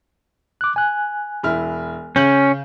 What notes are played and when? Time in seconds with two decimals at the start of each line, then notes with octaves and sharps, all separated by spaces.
0.61 D6 F#6
0.76 G#5 F#6
1.43 E1 E4 F6
2.16 C#3 C#4 G6 F#7